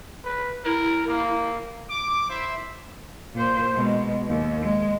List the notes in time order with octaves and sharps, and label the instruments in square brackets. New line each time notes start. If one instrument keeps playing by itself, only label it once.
[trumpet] B4
[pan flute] E4 [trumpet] A#4
[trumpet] A#3
[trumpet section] D6
E4 C5 E5
[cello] A#2 C5
B2 G#3
D#2
G#3